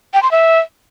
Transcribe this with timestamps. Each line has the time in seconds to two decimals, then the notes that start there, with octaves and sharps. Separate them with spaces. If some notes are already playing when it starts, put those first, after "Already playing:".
0.14 G5
0.23 C6
0.31 E5